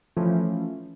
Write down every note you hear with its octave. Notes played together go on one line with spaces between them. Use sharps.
E3 F3 A3 C#4 F4